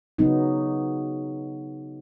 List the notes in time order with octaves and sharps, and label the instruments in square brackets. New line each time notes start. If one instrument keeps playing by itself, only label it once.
[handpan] C#3 F#3 B3 D#4